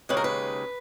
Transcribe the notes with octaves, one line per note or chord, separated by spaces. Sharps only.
D#2 C#3 G#3 B4
A#4
B4